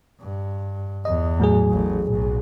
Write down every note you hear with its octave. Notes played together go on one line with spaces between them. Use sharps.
G2
E2 D#5
A2 F#3 G#4
A1
B1